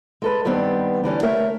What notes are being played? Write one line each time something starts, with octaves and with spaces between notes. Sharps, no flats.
G#3 A4 B4
G2 D#3 G3 B3 C4
D3 E3 G3 C#4
A3 A#4 C#5 E5